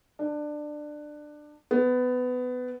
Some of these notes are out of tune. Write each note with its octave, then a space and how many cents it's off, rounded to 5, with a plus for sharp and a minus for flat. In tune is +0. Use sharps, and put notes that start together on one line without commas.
D4 +20
B3 +20